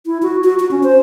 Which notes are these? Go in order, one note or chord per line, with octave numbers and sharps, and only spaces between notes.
E4
F#4
F#4
F#4
C#4
C5